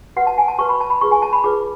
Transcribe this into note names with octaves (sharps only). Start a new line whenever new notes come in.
F#4 B4 F#5
A5
G#5
A5
F#4 B4 C#6
B5
A5
B5
F4 G#4 B4 C#6
G#5
A5
B5
F4 G#4 B4 D6